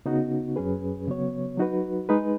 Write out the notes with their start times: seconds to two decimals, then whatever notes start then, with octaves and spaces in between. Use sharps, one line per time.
0.06 C#3 B3 D#4 F#4
0.56 F#2 F#3 C#4 G#4 B4
1.07 C#3 F#3 B3 F#4 C#5
1.57 F#3 D#4 F#4 B4
2.09 G#3 D#4 G#4 B4